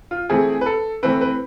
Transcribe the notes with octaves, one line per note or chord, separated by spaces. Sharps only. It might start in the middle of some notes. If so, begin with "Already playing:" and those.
F4
E3 A3 C4 G#4
B4
A4
E3 A3 C4 B4
B4